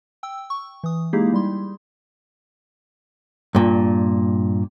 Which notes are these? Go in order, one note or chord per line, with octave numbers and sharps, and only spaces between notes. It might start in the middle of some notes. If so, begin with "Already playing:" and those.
G5 E6
C#6
E3 D#6
G#3 A#3 D#4 E4 G4 G#4
G3 C6
G2 A#2